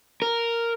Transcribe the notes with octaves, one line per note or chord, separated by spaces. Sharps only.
A#4